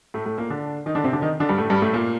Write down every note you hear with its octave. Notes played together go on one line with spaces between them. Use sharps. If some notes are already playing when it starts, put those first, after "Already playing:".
A2 A3
A2 A3
A#2 A#3
D3 D4
D#3 D#4
D3 D4
C3 C4
D3 D4
D#3 D#4
D3 D4
G2 G3
A2 A3
G2 G3
A2 A3
A#2 A#3